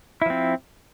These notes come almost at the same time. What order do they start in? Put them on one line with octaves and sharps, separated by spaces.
E4 F3 C4